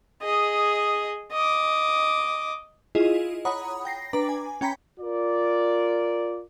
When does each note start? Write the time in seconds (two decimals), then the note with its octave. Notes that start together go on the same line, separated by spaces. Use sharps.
0.23 G#4 D#5
1.32 D#5 D6
2.95 E4 F4 G#4 D#5
3.45 C#5 F#5 A#5 B5 D#6
3.85 G5 A#6 C7
4.13 D4 B4 A#5 D6
4.29 G#5
4.61 C#4 G5 A#5 B5 B6
5.00 F4 A#4 D5